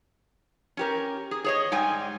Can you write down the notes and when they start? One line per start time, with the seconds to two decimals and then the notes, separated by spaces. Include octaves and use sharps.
0.77 C#4 G4 A#4
1.31 G#4
1.44 G#4 C#5 D#5
1.72 G#2 G3 G5 G#5